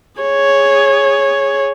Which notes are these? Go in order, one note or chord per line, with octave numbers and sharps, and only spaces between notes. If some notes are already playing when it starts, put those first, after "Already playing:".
G#4 C#5